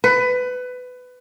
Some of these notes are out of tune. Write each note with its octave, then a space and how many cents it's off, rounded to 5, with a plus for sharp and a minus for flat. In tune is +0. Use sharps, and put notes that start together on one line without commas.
B4 +20